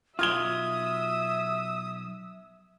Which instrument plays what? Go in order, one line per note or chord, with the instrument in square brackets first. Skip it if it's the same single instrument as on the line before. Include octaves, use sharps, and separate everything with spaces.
[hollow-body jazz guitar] B1 F4 [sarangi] E5 [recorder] D#6 [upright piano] F6 G#6 G7